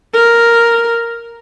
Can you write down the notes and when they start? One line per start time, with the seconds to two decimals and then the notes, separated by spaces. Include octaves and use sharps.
0.14 A#4